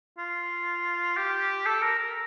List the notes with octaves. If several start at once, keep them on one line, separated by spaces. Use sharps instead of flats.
F4
G4
A4
A#4
A#4